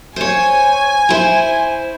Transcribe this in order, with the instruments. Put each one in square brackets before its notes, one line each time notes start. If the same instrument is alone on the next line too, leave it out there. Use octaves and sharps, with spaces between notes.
[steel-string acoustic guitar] C5 C#5 [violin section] G#5
[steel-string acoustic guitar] E4 C5